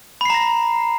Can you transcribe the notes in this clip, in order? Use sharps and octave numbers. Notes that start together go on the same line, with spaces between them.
A#5 B5 A#6 C7